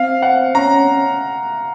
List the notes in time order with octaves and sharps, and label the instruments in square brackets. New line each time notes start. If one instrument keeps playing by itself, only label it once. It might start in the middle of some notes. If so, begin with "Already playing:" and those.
Already playing: [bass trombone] C4 [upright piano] F5
[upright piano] F#5
[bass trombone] C#4 [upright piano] A#5